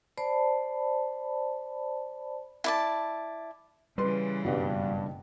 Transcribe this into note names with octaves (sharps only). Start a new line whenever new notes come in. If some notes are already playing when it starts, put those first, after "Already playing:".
C5 D5 A5 B5
E4 D5 A5
C#3 E3 G3 B4 C6
F#1 G2 B2 F#5